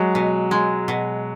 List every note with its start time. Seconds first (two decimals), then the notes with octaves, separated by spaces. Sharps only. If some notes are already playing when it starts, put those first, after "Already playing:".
Already playing: F#3 G#3
0.15 B2
0.51 G#3
0.88 B2